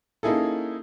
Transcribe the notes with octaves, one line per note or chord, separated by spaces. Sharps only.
A#3 C#4 D#4 E4 G#4 A4